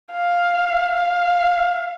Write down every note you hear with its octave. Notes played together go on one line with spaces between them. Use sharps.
F5
F5